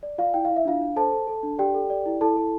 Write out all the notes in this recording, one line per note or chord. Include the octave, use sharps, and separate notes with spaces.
D5
F4 D5 F5
E4 G5
E4 F5
E5
D4 F4 F5
D4
A4 C5 A5
A4
A4
D4
G4 D5 G5
A4
D5
E4
E4 A4 A5
A4